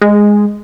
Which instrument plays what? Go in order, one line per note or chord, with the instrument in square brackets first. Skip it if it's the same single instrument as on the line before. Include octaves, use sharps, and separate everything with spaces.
[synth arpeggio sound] G#3